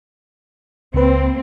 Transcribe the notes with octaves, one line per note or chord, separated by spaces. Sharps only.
C#2 A#3 C4 B4